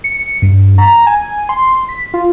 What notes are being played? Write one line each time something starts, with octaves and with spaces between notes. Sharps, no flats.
C#7
G2
A#5
G#5
C6
B6
F4